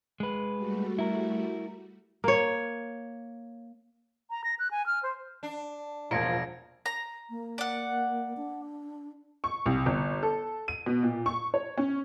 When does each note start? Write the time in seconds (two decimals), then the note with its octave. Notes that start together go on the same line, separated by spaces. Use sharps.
0.20 G#3 B4
0.56 G3 A3 F#4
0.99 E4 A#4
2.24 A#3 C#5
4.30 A#5
4.44 A#6
4.59 F#6
4.71 G#5
4.86 F6
5.03 C5
5.43 D4
6.11 E1 A#2 F3 G#6 A#6 C#7 D7
6.86 A#5
7.30 A#3
7.58 D5 F#5
8.37 D4
9.44 C#6
9.66 C2
9.86 G1
10.23 A4
10.68 D#7
10.86 B2
11.03 A#2
11.26 C#6
11.54 C#5
11.77 C#4